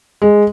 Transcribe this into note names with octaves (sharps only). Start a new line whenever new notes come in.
G#3